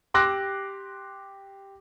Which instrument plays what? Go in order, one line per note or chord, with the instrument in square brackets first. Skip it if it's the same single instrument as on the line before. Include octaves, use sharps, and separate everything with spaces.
[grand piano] G4 C6 D6 E6 F#6 A#6